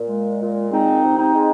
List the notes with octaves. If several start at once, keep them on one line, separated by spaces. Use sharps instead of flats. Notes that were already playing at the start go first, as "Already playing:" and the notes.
Already playing: A#2
G#3
A#2
G#3 C4 D#4
C3
C4 D#4
G#3